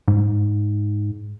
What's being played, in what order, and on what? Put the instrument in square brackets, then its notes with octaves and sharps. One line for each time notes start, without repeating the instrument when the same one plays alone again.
[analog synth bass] G#2